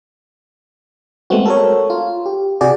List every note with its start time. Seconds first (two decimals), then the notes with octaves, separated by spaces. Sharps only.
1.30 G#3 A3 B3 C4 F#4
1.46 A4 A#4 C#5
1.90 F4
2.26 G4
2.61 C3 F#4 G#4 D5